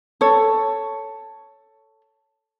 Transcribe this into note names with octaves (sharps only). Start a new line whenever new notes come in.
A4 C#5